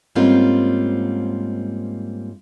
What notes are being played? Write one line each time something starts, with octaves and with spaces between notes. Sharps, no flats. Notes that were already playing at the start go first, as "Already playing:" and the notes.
G#2 G3 A#3 C4 C#4 F4